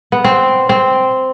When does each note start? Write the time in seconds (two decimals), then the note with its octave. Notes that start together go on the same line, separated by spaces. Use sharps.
0.12 B3
0.24 C4
0.69 C4